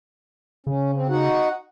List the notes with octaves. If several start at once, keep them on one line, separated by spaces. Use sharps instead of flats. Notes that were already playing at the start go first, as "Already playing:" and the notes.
C#3 C#4
C4
D#4 F#4 F#5